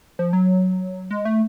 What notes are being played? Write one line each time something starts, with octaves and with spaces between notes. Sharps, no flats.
F3
F#3
G#3
A3